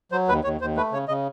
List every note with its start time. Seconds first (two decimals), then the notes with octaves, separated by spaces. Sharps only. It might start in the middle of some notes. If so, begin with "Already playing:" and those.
0.12 F#3 C5
0.28 D#2 B4
0.44 D#2 C#5
0.61 D#2 C5
0.76 A3 B4
0.92 C#3 C#5
1.08 C#3 D#5